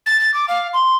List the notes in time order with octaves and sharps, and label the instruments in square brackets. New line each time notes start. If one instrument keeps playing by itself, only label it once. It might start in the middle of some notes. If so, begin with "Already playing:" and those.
[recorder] A6
A6
D6
F5
C6